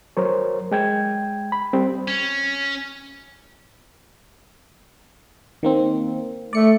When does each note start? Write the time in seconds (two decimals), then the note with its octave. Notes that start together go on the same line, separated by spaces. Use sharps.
0.17 F#3 A#4 C5 C#5
0.72 G#3 G5 G#6
1.52 B5
1.73 G3 C4
2.08 C#4
5.63 D#3 A#3 C4
6.53 A3 D5 C#7